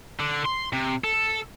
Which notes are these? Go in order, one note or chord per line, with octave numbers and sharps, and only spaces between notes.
D3
C6
C3
A4